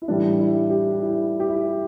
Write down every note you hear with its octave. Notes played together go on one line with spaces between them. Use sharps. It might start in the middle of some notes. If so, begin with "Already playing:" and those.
E4
A2 E3 G3 D4
E4
G4
E4
G4
E4